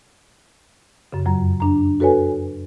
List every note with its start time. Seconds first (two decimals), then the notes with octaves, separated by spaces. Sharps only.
1.13 F#2 C#3
1.26 F2 F#3 A#5
1.60 D4 A#5
2.00 F#4 A4 B4 C#5 G#5